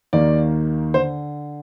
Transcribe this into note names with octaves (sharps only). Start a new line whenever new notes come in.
D#2 D#3 A#3 D5
D3 C5